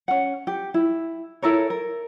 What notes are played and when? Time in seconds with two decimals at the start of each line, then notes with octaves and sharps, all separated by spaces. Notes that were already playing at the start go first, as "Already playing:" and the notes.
0.08 C#4 F#5
0.47 G4
0.74 E4
1.42 E4 A4 A#4 C#5
1.70 A#4